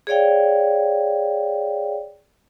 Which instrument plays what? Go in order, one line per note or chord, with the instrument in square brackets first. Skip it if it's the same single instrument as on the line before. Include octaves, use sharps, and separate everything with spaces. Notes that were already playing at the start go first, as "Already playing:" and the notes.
[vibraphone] G#4 C#5 D5 F5 G5